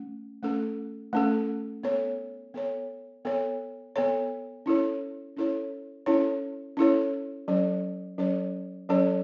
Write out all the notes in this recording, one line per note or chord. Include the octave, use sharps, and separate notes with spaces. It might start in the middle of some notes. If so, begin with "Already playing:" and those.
Already playing: A3 C#4
A3 C#4 A4
A3 C#4 A4
B3 A4 C#5
B3 A4 C#5
B3 A4 C#5
B3 A4 C#5
C#4 E4 A4 C#5
C#4 E4 A4 C#5
C#4 E4 A4 C#5
C#4 E4 A4 C#5
F#3 C#4 A4 C#5
F#3 C#4 A4 C#5
F#3 C#4 A4 C#5